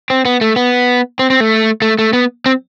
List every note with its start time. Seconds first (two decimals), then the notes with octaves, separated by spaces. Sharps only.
0.10 C4
0.25 B3
0.41 A3
0.56 B3
1.19 C4
1.30 C4
1.40 A3
1.82 A3
1.99 A3
2.13 B3
2.46 C4